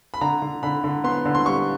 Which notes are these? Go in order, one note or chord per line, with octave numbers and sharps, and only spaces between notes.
B5
D3 A#5
D3
D3 B5
D3
B3 C6
D3
C6
G3 C#6